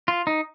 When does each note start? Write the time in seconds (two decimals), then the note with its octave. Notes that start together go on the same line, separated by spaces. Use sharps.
0.08 F4
0.27 D#4